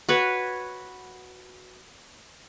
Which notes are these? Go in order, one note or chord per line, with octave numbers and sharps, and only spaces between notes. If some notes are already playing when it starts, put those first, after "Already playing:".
F#4 B4 C#5